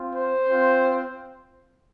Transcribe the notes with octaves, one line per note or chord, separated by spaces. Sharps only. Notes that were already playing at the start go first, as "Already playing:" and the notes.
Already playing: C4 F4
C5
C4 F4